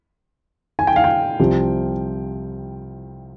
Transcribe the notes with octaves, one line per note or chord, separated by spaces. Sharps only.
G#5
G5
F5
G5
C2 C3 F3